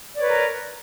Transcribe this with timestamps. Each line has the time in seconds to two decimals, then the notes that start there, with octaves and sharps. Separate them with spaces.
0.14 D5
0.17 C#5
0.21 B4
0.24 A#4